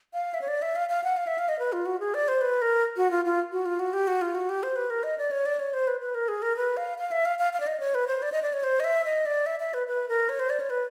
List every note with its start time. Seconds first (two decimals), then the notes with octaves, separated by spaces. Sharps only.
0.13 F5
0.34 E5
0.41 C#5
0.48 D5
0.62 E5
0.76 F5
0.89 F5
1.04 F#5
1.17 F5
1.27 E5
1.38 F5
1.49 D#5
1.59 B4
1.73 F4
1.86 F#4
2.00 G#4
2.14 D5
2.28 C5
2.41 B4
2.62 A#4
2.97 F#4
3.11 F4
3.25 F4
3.52 F#4
3.66 F4
3.79 F#4
3.93 G4
4.07 F#4
4.21 F4
4.35 F#4
4.49 G4
4.63 C5
4.76 B4
4.90 A#4
5.03 D#5
5.18 D5
5.31 C#5
5.46 D5
5.59 C#5
5.73 C5
5.88 B4
6.00 B4
6.15 A#4
6.28 G#4
6.42 A#4
6.56 B4
6.77 F5
6.98 F5
7.11 E5
7.25 F5
7.39 F5
7.53 F5
7.60 D5
7.67 D#5
7.80 C#5
7.95 B4
8.07 C5
8.22 D5
8.32 D#5
8.42 D5
8.53 C#5
8.64 C5
8.80 D#5
8.84 E5
9.05 D#5
9.26 D5
9.46 E5
9.60 E5
9.74 B4
9.88 B4
10.09 A#4
10.29 C#5
10.39 C5
10.50 D5
10.60 C#5
10.70 B4